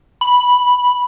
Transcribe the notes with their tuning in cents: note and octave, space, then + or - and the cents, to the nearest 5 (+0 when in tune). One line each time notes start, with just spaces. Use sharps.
B5 -5